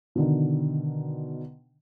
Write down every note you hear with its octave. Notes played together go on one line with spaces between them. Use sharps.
B2 D3 D#3